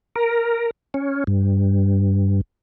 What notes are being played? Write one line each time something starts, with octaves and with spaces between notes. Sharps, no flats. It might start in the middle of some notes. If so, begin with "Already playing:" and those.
A#4
C#4
G2